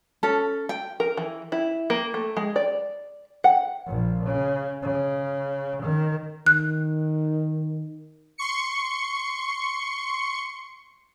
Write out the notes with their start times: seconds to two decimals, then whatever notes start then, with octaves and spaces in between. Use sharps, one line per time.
0.23 C#4 A4
0.69 G5
1.00 A#4
1.17 E3
1.52 E4
1.90 A#3
2.14 A3
2.37 G#3
2.56 D5
3.44 F#5
3.86 A#1
4.26 C#3
4.82 C#3
5.82 D#3
6.46 D#3 F#6
8.38 C6 C#6 C#7